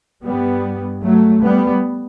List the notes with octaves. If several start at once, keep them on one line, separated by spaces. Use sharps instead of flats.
G2 G3 B3
F#3 A3
G3 B3